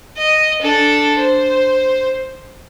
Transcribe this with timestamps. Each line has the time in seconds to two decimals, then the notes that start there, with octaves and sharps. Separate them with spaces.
0.17 D#5
0.61 D4 A4
1.20 C5